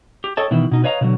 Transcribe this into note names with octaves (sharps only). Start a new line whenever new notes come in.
G4
A4 C#5 D#5 G5 A5
B2 D#3 E3 E4
B2 D#4
B4 C#5 D#5 F5 A5 A#5
B2 D3 F#3